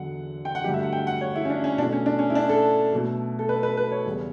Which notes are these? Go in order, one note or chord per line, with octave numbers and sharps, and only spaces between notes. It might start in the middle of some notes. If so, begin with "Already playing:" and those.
Already playing: E2 D3 F#3 F#5
G5
F#5
G2 D3 F#3 A3 G4
E5
F#5
G5
F#5
C#5
E4
C#4
D4
C#4
B2 A3 D4
C#4
D4
C#4
E4
D4
A4
B2 F#3 A3
A4
B4
B4
B4
C#5
E2 C#3 G3